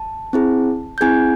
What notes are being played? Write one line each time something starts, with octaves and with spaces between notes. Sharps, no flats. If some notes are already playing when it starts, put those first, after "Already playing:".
Already playing: A5
C4 E4 G#4
G6
C4 E4 G#4 G#5 G#6